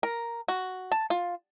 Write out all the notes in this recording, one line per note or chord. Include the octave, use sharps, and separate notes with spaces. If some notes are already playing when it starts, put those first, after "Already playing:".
A#4
F#4
A5
F4